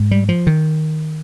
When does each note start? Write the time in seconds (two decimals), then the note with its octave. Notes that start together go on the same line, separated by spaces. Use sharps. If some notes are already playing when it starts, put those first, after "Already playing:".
Already playing: G#2
0.11 G3
0.29 F3
0.47 D#3